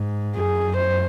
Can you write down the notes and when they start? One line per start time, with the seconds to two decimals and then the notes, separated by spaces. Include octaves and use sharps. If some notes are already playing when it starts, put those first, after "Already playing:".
Already playing: G#2
0.36 F#2 G#4
0.77 C5